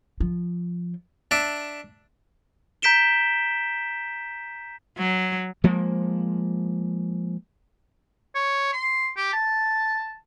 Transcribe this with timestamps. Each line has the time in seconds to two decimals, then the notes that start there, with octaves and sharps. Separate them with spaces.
0.20 F3
1.31 D4 E5
2.82 A#5 G6 B6 D7 E7 G7
4.97 F#3
5.64 F3 G#3 A#3
8.35 C#5
8.73 C6
9.17 G4
9.33 A5